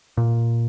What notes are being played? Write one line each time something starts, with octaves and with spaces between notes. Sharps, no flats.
A#2